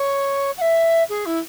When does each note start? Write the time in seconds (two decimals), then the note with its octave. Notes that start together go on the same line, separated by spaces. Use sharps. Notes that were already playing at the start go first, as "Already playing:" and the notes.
Already playing: C#5
0.57 F#5
0.61 E5
1.09 G#4
1.25 E4